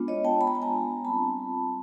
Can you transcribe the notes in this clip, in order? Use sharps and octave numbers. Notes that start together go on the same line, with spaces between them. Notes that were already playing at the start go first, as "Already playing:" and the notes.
Already playing: G#3 B3 D4 F4
C#5 D#5
G5 A5
B5
A#5
A5
G#5 A#5
G3 C4 F4 A5 B5